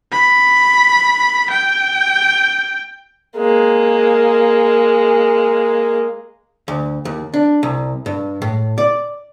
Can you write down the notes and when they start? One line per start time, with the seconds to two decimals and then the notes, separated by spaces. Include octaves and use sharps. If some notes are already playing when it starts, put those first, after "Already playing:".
0.12 B5
1.50 G5
3.37 G#3 A#3
6.68 D2
7.05 D#2
7.34 D4
7.63 C2
8.06 G2
8.42 A2
8.78 D5